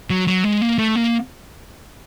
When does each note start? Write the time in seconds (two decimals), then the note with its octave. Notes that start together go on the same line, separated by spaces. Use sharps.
0.10 F#3
0.27 F#3
0.44 G#3
0.61 A#3
0.78 A3
0.96 A#3